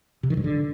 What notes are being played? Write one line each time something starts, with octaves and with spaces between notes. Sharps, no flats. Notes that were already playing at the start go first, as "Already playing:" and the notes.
C3
D#3
G2
D3